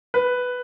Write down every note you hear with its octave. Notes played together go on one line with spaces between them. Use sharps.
B4